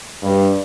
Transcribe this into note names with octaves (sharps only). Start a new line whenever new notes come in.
G2